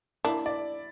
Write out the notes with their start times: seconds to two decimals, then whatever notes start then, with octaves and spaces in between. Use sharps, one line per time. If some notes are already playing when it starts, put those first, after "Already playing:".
0.25 A#3 D4 E4
0.46 D5